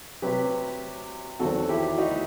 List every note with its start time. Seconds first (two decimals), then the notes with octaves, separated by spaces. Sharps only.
0.22 C3 F#3 C4 G4 B4
1.39 E2 D#3 F#3 C4 F#4 A4
1.69 E4 G4
1.98 D#4 F#4